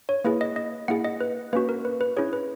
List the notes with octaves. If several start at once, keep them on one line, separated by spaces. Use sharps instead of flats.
C#5
A#3 E4 G#4 B4
D#5
D#5
A#3 E4 G#4 F#5
D#5
B4
A#3 C#4 F#4 B4
A#4
B4
B4
C#4 E4 G#4 C#5
B4